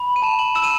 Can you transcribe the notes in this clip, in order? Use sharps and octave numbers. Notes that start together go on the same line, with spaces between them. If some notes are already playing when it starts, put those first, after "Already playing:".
Already playing: B5
D#7
A5 E7
F#7
E6 E7
D#7